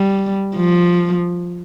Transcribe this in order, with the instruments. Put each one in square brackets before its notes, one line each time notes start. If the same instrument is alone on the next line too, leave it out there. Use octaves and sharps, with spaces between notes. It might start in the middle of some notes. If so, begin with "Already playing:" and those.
Already playing: [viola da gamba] G3
F3